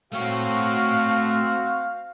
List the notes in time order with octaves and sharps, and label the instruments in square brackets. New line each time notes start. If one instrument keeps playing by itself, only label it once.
[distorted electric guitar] A3 C#5 [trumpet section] C4 F#4 [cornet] F5